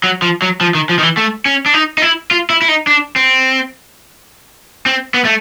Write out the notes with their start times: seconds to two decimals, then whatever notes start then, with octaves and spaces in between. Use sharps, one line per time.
0.04 F#3
0.22 F3
0.42 F#3
0.61 F3
0.75 D#3
0.89 F3
0.98 D#3
1.03 E3
1.17 A3
1.46 C#4
1.66 D4
1.74 D#4
1.98 D#4
2.02 E4
2.31 F4
2.50 E4
2.62 E4
2.68 D#4
2.87 D4
3.16 C4
4.86 C4
5.14 B3
5.25 A3